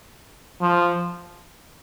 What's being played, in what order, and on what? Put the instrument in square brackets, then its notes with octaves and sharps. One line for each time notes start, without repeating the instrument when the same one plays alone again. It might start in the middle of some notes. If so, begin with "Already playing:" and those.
[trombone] F3